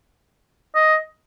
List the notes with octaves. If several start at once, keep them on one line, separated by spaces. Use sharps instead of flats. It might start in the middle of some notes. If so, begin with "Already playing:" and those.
D#5